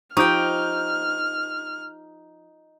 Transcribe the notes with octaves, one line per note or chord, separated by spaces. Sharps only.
F3 D#4 G4 G5 C#6 D6 F6 G6